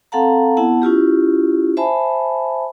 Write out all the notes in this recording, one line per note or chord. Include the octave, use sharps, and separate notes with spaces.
C4 A4 F5 F#5 A5 A#5
B3 E4 F#5 A5
C#4 E4 F4 G4
C5 E5 G#5 A5 B5